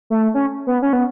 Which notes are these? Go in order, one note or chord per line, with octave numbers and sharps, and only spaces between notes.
A3
C#4
B3
C#4
B3